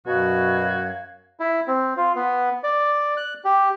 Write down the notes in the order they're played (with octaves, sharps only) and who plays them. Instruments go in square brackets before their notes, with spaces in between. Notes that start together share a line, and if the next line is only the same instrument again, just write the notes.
[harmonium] F#2 [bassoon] B2 [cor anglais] F#4 [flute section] C#5 F5 G#6
[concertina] E4
C4
F4
B3
D5
F#6
G4